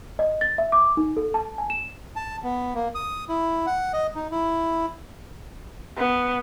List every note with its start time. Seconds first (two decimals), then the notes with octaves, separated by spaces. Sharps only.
0.19 D#5
0.41 A6
0.58 E5
0.72 D6
0.97 D#4
1.17 A4
1.34 A5
1.58 G#5
1.70 E7
2.16 A5
2.43 B3
2.75 A#3
2.95 D#6
3.29 E4
3.66 F#5
3.93 D#5
4.15 D#4
4.32 E4
5.97 B3